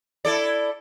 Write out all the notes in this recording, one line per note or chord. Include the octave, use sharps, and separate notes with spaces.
E4 A4 D5